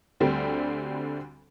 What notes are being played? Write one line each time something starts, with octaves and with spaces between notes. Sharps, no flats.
D2 D3 G3 C4